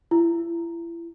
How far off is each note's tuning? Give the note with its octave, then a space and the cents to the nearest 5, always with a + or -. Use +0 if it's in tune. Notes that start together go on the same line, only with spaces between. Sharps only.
E4 +35